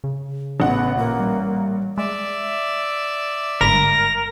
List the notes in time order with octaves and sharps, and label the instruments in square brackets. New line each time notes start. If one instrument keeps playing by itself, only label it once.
[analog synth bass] C#3
[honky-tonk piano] A1 F#5 [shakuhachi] B3
[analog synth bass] A#2 [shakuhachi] A#3
[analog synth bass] G3
[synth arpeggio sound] G#3 [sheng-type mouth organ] D5 E5
[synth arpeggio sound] G1 G#2 B5 [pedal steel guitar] A#4 [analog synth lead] A#6